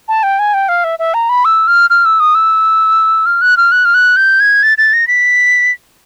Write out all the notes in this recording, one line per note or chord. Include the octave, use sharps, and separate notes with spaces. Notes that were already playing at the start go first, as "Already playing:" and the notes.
A5
G5
G#5
G5
F5
E5
E5
A#5
B5
E6
F6
F6
E6
D#6
E6
F6
F#6
F6
F#6
F6
F#6
G6
G#6
A6
A6
A#6
B6